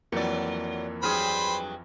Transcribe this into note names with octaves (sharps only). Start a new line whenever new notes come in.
F2 E3 F#3 A#3 D5 C#7
G2 F#3 G#4 C5 B5 F6